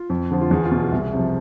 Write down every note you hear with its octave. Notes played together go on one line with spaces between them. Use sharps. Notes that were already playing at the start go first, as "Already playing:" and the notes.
Already playing: F4
F2
D3 F3
F4
E2 G#4
F4
B2
G#4
C2
C3 F3